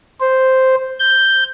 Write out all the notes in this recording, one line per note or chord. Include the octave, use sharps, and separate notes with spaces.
C5
G6